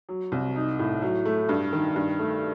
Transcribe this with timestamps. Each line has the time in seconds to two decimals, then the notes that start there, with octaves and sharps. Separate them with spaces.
0.09 F#3
0.32 C2
0.56 D#4
0.79 A2
1.02 F#3
1.25 A3
1.49 G2
1.73 D#3
1.96 G2
2.19 A3